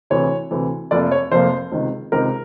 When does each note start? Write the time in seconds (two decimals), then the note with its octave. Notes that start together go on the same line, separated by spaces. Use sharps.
0.10 D2 C3 E3 C#5
0.51 D2 C3 E3
0.91 F1 F2 C3 F3 A#3 D5
1.12 C#5
1.31 F1 F2 C3 F3 A#3 C5
1.72 C#2 C3 D#3
2.12 C#2 C3 D#3 A#4